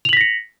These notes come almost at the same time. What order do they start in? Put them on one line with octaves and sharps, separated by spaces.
F7 F#7 B6 A#6 C#7